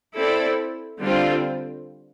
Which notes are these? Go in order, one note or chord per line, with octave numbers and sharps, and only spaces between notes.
C4 E4 A4 D5
D3 G3 C4 F4